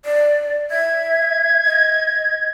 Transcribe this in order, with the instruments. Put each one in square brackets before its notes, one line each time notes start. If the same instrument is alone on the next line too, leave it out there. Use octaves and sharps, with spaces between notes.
[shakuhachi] D5
[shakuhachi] E5 [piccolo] G#6
[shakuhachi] D#5